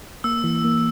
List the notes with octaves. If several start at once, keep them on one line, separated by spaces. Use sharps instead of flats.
A#3 E6
E3
A#3